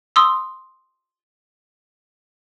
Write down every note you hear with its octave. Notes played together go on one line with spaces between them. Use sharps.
C6 D#6 E6